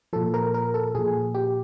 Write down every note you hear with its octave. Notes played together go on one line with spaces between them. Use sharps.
A#2 F3 A4
A#4
A#4
A4
A#2 F3 G#4
G4